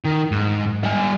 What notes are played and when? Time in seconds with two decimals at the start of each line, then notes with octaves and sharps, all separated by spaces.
0.05 D#3
0.31 G#2
0.83 G3 G#5